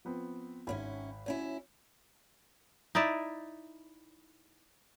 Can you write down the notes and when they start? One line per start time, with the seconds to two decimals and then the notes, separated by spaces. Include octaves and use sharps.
0.05 F3 B3 C4
0.67 G#1 G#2 C#4 E4 B5
1.26 D2 C#4 E4 C#5
2.95 D#4 E4 D5 E5